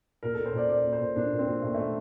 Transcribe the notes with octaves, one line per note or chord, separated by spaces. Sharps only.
A#2 A#4
A#2 A4
C5
A#2 D5
A#2 D5
A#2
C5
A#2
A#2 D4
A#2
C4
A#2
A#2 A3
A#2 A3